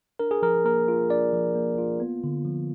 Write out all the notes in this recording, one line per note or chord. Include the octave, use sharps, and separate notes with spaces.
D4 A#4
G#4
F3 A#4
A#3 A#4
F4
D4 D5
F3
A#3
F4
B3
D3
F3